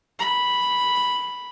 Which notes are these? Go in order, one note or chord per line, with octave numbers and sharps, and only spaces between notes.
B5